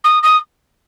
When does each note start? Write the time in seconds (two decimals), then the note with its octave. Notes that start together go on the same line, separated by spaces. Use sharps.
0.04 D#6
0.23 D#6